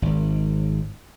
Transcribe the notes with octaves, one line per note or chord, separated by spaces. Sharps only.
G#1